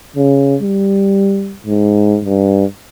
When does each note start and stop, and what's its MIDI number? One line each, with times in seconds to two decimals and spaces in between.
0.16 0.56 49
0.62 1.56 55
1.66 2.19 44
2.25 2.64 43